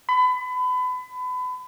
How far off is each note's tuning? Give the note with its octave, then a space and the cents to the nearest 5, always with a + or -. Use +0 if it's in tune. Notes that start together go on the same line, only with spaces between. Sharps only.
B5 +30